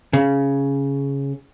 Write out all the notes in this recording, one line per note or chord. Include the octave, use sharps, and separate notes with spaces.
C#3